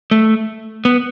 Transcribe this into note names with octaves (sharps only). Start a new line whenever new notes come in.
A3
B3